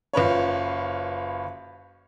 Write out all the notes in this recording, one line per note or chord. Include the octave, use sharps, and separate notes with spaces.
F#1 F4 B4 C#5